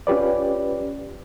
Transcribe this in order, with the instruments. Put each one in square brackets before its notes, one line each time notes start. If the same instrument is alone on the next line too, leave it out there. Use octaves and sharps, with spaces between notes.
[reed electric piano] C#4 F4 G4 B4 D5